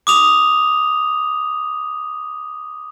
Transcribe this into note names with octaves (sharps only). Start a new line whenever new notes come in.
D6 D#6 F7